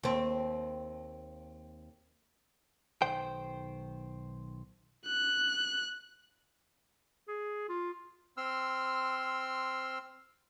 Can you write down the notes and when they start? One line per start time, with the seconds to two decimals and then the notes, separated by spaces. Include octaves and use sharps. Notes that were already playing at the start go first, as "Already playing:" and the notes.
0.03 D#2 C4
3.02 B1 D#3 C5 G5
5.07 F#6
7.27 G#4
7.69 F4
8.37 C4 C6 E6 F6